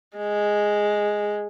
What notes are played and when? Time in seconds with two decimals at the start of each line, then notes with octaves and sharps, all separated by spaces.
0.17 G#3